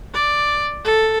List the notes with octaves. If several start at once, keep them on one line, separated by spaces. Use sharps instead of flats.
D5
A4